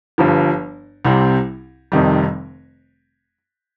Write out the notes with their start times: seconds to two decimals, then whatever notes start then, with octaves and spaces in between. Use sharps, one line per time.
0.18 G1 G2 F3
1.05 C2 C3 G3 C4
1.92 F1 F2 C3 D#3 G3